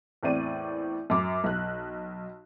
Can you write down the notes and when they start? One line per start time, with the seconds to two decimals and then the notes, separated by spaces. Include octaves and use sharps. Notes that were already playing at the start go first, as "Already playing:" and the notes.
0.23 E2 A2 C4 D5 D#7
1.10 F#2 D6
1.44 B1 F#6